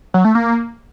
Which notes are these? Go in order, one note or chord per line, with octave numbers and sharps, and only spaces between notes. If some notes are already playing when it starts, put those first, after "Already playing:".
F#3
A3
A#3